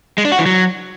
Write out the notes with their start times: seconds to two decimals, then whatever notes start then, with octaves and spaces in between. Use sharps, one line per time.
0.18 G#3
0.25 D4
0.32 F#4
0.39 E3
0.46 F#3